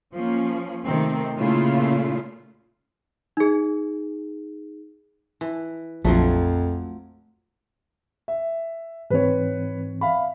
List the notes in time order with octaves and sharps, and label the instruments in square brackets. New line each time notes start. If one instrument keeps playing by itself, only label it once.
[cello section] F3 A#3 C#4
C3 D#3 A3 C4
A#2 C#3 A3 A#3 E4 F4
[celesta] D#4 G#4
[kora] E3
[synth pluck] A#1 [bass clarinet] F2 [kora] F3 F#3 A3
[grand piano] E5
[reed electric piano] G#2 E3 C4 [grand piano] B4 C#5
[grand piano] E5 F5 B5